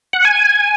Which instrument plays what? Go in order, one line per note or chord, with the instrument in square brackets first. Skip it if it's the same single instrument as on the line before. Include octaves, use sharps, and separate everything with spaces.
[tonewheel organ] F#5
G#5